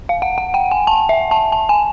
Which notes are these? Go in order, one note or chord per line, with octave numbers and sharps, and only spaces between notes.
F5
F#5
F#5
G5
G#5
A5
E5
A5
A5
G#5